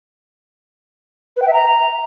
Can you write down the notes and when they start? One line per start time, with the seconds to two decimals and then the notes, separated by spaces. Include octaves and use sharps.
1.36 B4
1.42 G5
1.47 E5
1.53 A#5